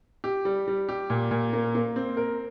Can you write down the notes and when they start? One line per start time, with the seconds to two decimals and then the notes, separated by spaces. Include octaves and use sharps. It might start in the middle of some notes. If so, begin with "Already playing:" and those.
0.24 G4
0.45 G3
0.68 G3
0.89 G4
1.10 A#2
1.31 A#2
1.53 A#3
1.75 A#3
1.96 C4
2.17 A#4